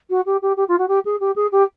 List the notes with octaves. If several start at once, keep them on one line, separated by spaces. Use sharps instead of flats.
F#4
G4
G4
G4
F4
F#4
G4
G#4
G4
G#4
G4